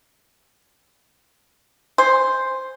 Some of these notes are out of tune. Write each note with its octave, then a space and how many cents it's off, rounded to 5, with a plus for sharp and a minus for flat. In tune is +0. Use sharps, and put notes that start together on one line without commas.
C5 +0 G#5 -15